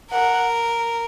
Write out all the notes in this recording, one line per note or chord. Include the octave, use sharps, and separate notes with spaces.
A#4 F#5